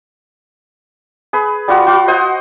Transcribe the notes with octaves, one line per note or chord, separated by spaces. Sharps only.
G#4 B4
G3 F4 F#4
F4 F#4
C5 D#5 F#5